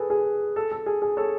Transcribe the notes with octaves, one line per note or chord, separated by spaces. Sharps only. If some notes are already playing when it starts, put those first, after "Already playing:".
Already playing: G#4 A4 B4
G#4
A4
A4
G#4
G#4
A4 C#5